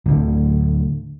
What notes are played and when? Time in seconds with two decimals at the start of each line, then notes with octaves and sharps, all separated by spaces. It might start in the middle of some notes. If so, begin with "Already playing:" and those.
0.06 D1 D2 D3